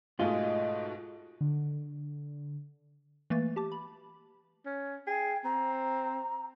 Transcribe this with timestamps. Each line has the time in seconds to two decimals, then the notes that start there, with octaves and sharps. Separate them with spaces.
0.19 G#2 B2 G#3 A3 F4 G#4
1.41 D3
3.30 E3 A3 A#3 B4 A6
3.56 G4 A5 D6
3.72 B5
4.65 C#4
5.07 G#4 G5
5.44 C4 A#5